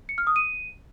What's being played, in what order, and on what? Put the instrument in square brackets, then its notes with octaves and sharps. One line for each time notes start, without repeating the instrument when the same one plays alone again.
[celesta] C#7
F6
D#6
D#7